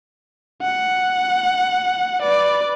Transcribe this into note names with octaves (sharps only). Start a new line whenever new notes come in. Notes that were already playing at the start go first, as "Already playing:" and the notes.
F#5
B4 D5